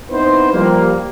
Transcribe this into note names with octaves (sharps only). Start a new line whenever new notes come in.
B3 C4 D#4 E4 B4 C5
F3 G3 A#3